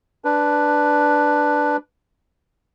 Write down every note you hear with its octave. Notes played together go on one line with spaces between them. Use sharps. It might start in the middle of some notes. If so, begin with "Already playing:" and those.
D4 B4